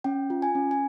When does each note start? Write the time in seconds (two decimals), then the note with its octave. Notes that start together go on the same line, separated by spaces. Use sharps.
0.04 C#4 G5
0.30 F4
0.42 G#5
0.55 C#4
0.71 G#5